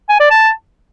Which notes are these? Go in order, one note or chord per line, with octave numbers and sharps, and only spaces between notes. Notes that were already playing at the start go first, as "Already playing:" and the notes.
G#5
D5
A5